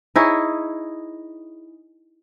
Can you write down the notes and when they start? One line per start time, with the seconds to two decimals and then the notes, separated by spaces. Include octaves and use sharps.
0.16 D#4 E4 G#4 C#5